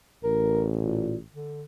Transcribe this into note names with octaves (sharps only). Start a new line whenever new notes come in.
A1 A#4
A#2
D3